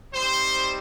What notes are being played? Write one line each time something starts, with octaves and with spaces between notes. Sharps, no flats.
G3 C4 D#4 G4 C5